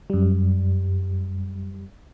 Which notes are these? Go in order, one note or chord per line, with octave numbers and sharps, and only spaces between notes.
F#2 G3